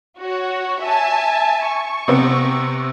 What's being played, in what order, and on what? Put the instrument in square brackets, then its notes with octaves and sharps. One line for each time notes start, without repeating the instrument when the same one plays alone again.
[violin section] F#4 C#5
E5 G#5 A5
C#6
[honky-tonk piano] C3 B3 C4